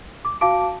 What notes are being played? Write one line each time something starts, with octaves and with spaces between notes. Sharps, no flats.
D6
F#4 F5 A5 D6 D7